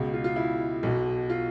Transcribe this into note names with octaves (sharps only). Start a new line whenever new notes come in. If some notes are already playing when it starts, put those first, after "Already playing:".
Already playing: C#2 B2
F4
F4
E4
B1 B2
F4